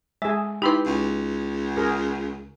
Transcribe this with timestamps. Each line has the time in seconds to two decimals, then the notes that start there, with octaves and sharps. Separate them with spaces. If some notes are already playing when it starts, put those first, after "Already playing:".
0.22 G#3 G#4 E5
0.62 D#4 E4 G4 B4 B5 C6
0.86 C#2
1.77 G#4 A#4